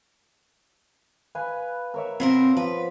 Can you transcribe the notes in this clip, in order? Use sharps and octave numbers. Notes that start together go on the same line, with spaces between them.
B4 F5 G#5
A#4 C#5 E5
B2 B3 C4 F4 A#4
F3 B4